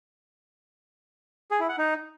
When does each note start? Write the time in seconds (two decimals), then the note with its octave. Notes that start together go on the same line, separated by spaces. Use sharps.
1.51 G#4
1.60 E4
1.69 F#5
1.78 D#4